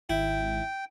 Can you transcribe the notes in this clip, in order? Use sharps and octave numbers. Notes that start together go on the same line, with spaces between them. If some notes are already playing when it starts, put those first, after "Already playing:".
G#1 E4 G5